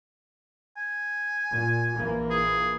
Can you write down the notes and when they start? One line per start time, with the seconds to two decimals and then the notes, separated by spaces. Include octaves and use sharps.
0.77 G#5
1.52 A#2
1.96 A#1 E3 A#3
2.30 G#4